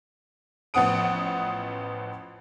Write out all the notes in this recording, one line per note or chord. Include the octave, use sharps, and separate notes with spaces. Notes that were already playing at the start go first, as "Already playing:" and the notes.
A1 F3 B3 F#5 D#6 D7